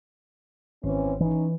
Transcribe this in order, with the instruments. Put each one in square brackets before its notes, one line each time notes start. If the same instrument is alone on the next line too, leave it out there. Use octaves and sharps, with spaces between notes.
[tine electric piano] G#1 [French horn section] E3 C4 C#4
[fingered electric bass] E3 [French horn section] C#4 D#4